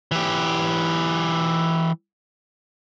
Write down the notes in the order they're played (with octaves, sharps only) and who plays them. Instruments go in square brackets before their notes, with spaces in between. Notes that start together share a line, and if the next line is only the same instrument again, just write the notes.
[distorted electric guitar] E3 G4